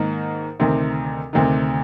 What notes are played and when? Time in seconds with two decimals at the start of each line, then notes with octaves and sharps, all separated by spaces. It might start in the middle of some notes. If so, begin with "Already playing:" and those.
Already playing: G#2 D#3 A#3
0.60 D2 C3 D#3
1.33 D2 C3 D#3